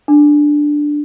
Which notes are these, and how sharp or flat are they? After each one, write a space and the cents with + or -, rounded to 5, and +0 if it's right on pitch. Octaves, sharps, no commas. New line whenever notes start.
D4 +5